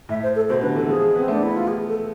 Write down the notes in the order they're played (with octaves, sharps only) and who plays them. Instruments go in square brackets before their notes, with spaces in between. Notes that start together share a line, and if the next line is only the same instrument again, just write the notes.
[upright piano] A2 [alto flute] E5
[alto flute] C5
A4
[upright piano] B2 [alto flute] C5
[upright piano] C3
[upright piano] D3 [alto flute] B4
[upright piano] E3 [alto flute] A4
[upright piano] F3 [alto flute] G#4
[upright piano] G#3
[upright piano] B3 [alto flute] C4
[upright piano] A3 [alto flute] D4
[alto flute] E4
F4
G#4
A4